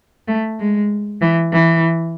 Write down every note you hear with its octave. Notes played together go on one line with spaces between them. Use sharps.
A3
G#3
E3
E3